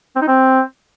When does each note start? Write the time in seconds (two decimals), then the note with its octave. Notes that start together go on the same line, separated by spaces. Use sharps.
0.16 C4
0.22 D#4
0.28 C4